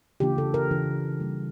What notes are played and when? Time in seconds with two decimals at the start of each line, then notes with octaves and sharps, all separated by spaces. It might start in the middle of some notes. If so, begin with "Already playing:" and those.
0.20 C#3 E3 A#3 D4 F4 G4
0.38 A4
0.54 A#4
0.70 C#3 E3 A#3 D4 F4
1.20 G3 A#3 E4